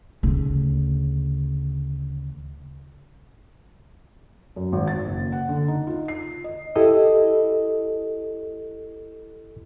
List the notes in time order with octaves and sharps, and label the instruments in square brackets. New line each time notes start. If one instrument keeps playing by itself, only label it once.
[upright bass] D2 C#3
[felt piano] F#2
G#1
A6
F#1
F#5
D3
D#4
F4
C7
D#5
[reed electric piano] E4 G4 A4 D#5